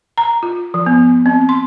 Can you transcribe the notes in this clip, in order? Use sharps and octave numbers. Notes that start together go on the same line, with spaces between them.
A#5
F4
F3
B3
C4
C6